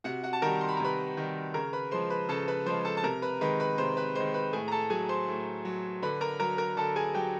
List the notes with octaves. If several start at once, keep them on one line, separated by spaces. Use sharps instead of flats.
C3 F#4 F#5
F#4 F#5
A5
D#3 G3 A#4 A#5
C6
B5
A#5
C3 B4 B5
D#3 G3
C#3 A#4 A#5
B4 B5
F3 G#3 C5 C6
B4 B5
C#3 A4 A5
B4 B5
F3 G#3 C5 C6
A4 A5
A5
C3 A#4 A#5
B4 B5
D#3 G#3 B4 B5
B4 B5
C3 C5 C6
B4 B5
D#3 G#3 C5 C6
B4 B5
A2 G#4 G#5
A#5
A4 A5
F#3 G#4 G#5
C5 C6
A2
F#3
D3 B4 B5
A#4 A#5
F#3 A#4 A#5
A#4 A#5
D3 A4 A5
G#4 G#5
F#3 G4 G5